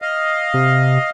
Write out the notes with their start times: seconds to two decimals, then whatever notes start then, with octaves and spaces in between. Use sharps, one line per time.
0.02 D#5 F5
0.54 C3